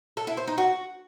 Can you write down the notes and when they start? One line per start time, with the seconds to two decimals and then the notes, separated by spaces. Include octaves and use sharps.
0.17 A4
0.27 E4
0.37 C5
0.47 D#4
0.58 F#4